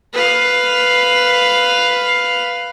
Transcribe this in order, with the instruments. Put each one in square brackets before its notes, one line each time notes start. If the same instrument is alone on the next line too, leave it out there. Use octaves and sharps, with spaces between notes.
[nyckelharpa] B4 F5